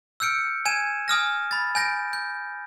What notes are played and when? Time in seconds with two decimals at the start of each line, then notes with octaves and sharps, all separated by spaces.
0.20 E6 F6 G6 C#7 D7
0.65 G#5 G#6 D#7 E7
1.08 G#5 D#6 F6 A#6
1.51 B5 A6
1.75 G#5 G6 A#6 D7
2.13 G6